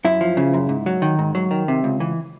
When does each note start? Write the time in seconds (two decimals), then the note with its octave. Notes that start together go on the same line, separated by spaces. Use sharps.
0.05 F#2 E4
0.21 F3
0.37 C#3
0.54 F#2
0.69 G#2
0.86 F#3
1.02 D#3
1.19 G#2
1.35 F#3
1.51 D#3
1.68 C3
1.84 C#2
2.00 E3